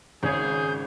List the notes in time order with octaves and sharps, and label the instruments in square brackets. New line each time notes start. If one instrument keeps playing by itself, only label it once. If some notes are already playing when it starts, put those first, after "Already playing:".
[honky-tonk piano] G#1 C#5 [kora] C#3 [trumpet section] G#4 [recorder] G6